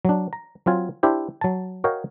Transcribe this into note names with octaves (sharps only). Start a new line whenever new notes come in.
F#3 D4
A#5
F#3 C4 F4 G#5
D4 E4 G4 C5
F#3 A5
F#4 A#4 C#5 D#5 F5 G5